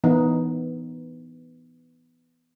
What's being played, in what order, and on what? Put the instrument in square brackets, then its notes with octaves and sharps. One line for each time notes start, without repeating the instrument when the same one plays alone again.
[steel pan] E3 B3 D#4